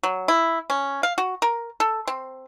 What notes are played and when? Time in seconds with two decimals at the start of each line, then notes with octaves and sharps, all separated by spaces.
0.03 F#3
0.28 E4
0.70 C#4
1.03 F5
1.18 F#4
1.42 A#4
1.80 A4
2.07 C4